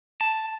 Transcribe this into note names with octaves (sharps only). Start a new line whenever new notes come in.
A5